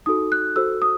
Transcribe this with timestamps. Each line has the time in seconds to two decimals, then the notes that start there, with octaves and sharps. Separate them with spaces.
0.06 D#4 F#4 A4 D#6
0.32 F#6
0.56 F#4 A4 C5 E6
0.82 D#6